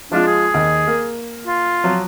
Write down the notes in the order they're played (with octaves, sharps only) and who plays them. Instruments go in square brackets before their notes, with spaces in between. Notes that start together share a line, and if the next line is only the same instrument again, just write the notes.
[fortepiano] F3 G#3 F4 [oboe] D4
[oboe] G#4
[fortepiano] D#2
A#3
[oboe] F4
[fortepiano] F3 F#3